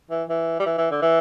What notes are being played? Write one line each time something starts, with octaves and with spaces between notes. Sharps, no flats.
E3
E3
G3
E3
E3
D3
E3